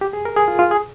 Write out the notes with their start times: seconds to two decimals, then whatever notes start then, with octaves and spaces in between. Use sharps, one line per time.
0.01 G4
0.13 G#4
0.25 A#4
0.37 G#4
0.48 F4
0.59 F4
0.71 G#4